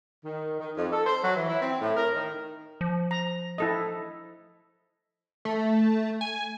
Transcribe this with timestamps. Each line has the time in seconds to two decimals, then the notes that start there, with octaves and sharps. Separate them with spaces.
0.25 D#3
0.60 D#3
0.77 F2
0.92 A4
1.06 C5
1.23 F#3
1.36 E3
1.49 E4
1.62 C4
1.81 A2
1.97 A#4
2.15 D#3
2.81 F3
3.11 A#5
3.58 E4 A4 D#5
5.45 A3
6.21 G#5